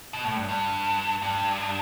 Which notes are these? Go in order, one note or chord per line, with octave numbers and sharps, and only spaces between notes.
B2
A2
G2
G2
G2